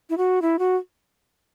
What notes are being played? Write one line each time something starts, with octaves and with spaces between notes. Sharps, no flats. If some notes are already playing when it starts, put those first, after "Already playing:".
E4
F#4
E4
F#4